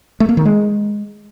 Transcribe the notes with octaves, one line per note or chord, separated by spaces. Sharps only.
A3
A#3
D#3
G#3